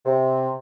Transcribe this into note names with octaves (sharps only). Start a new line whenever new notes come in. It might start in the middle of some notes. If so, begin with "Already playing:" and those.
C3